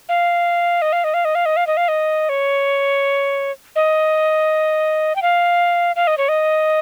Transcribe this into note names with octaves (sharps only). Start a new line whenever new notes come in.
F5
D#5
F5
D#5
F5
D#5
F5
D#5
F5
D#5
F5
D#5
C#5
D#5
G5
F5
F5
D#5
C#5
D#5